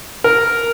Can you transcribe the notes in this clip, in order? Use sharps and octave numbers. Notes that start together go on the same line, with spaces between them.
A#4